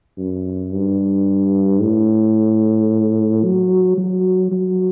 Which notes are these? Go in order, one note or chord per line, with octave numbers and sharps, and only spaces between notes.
F#2
G2
A2
F#3
F#3
F#3